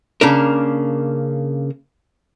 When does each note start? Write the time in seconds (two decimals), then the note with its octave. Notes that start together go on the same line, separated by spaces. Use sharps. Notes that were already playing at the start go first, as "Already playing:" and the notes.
0.21 C#3 A#3 D4 A#4